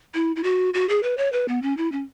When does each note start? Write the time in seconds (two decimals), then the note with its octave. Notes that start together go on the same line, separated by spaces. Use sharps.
0.14 E4
0.36 E4
0.44 F#4
0.74 F#4
0.89 G#4
1.03 B4
1.17 C#5
1.33 B4
1.48 B3
1.62 C#4
1.77 E4
1.92 C#4